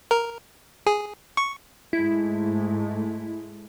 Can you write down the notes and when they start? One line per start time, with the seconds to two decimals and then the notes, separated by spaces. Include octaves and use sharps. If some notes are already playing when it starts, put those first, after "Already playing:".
0.11 A#4
0.87 G#4
1.37 C#6
1.93 G#2 G#3 A3 E4